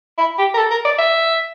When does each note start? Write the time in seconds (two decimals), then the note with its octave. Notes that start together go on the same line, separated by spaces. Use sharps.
0.18 E4
0.39 G4
0.54 A#4
0.58 A4
0.71 A#4
0.85 D5
0.99 E5